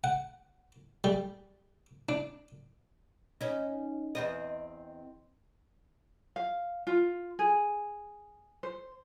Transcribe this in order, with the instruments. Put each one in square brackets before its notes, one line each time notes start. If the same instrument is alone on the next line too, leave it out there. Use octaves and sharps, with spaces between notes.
[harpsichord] F#5
G3
D4
[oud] C#4 D#4
E2 C4 D#5
[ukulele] F5
F4
G#4
C5